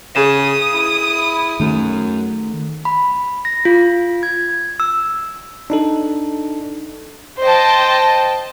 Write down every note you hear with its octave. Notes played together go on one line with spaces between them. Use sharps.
C#3 G#4 D#6 E7
E4
F#2 D#3 A3
B5
A#6
F4
G#6
E6
D4 D#4 A4
C5 D#5 G5 A5